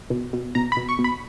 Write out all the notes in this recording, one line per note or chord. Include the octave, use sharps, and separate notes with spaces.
B2
B2
B2 A#5
B5
B2
C#6
B2
B5